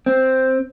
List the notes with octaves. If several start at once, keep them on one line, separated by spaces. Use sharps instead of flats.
C4